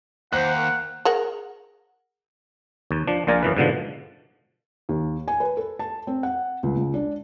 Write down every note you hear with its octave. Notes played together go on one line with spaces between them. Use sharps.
D#2 C5 F#5 F#6
A#4
G#4 A#4 F#5
D#2
F3 D4
A#1 A#2 F4 D5 G#5 A#5
F#2 E3 B4
G#2 B2 D3 F3
D#2
G#5
B4
A4
A5
C4
F#5
C#2
C#2
D4